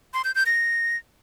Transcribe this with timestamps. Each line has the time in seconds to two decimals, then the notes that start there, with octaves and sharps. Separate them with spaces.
0.14 C6
0.24 G6
0.35 G6
0.46 A#6